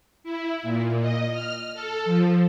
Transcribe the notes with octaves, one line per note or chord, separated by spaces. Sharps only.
E4
A#2
D#5
F6
A4
F3